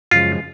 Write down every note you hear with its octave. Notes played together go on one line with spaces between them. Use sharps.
F#2 C#3 F3 G#3 F4